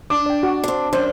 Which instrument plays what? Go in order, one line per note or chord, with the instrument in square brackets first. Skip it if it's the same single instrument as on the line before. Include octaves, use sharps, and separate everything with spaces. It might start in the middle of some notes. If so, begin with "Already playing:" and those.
[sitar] D4 [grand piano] D6
[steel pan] D5 G5
F#4
[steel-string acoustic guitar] C4 D4
[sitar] F#2 [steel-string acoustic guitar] D4 [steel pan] C5